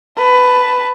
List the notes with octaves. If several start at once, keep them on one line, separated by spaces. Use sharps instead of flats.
B4 A5